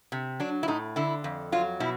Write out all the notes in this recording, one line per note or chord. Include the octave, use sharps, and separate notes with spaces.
C3
F#3 D4
E4
A2 D#4
D3 E4
F2
F#3 F4
B2 E4